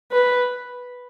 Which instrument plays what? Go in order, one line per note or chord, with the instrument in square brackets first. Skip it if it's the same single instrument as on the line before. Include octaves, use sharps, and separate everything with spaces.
[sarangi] B4